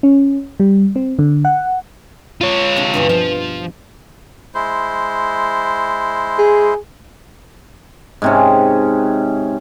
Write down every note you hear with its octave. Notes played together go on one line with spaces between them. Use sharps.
C#4
G3
C4
D3
F#5
F4 C#5
C3 D4
G2 B2 E3
F3 F4
G#3 E4 C5
G#4
G#2 C3 C#4